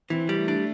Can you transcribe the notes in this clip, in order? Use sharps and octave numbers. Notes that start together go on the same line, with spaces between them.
E3 C4
G3
A3
D4